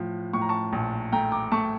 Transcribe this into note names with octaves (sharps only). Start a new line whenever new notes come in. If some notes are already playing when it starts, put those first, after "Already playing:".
Already playing: A2 F3
A2 C#6
A#5
A5 C#6
A#1
A3 G5 A#5
A#5 D6
A3 A5 C#6